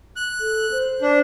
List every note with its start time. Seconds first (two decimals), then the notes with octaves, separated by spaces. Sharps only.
0.16 F#6
0.40 A4
0.71 C5
1.02 D4